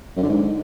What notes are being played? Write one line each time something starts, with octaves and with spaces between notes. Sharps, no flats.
F#2
D3
G#2